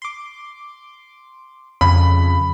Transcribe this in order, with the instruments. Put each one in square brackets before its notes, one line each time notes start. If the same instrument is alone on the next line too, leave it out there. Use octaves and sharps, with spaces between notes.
[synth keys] C6 D6
[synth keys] F2 C#3 [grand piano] B5